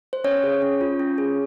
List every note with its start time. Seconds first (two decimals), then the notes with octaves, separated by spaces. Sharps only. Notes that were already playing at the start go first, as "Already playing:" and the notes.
0.13 C5
0.24 C#4 C#5
0.44 G#4
0.62 C#4
0.81 F4
0.99 C#4
1.18 G#4